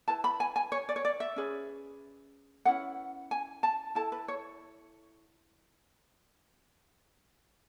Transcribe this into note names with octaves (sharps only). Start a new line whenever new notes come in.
E4 B4 A5
B5
G#5
G#5
C#5
D5
C#5
D5
E5
C#4 G#4 B4
C#4 E4 G#4 B4 F#5
G#5
A5
E4 A4 A5
B4
C#5